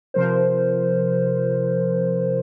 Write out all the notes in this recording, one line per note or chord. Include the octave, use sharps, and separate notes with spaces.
C3 F3 A#4 C5